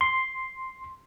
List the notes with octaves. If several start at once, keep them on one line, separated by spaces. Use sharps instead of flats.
C6